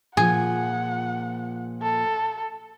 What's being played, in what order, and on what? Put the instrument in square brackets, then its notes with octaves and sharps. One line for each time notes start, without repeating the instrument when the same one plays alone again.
[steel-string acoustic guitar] A#2 F3 [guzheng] G#4 [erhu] F#5
[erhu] A4